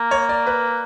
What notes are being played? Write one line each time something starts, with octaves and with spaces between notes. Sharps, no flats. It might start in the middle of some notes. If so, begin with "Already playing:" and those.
Already playing: A#3
C#5
D5
B4